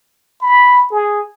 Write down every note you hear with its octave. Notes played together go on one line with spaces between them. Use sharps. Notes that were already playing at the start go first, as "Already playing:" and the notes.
B5
G#4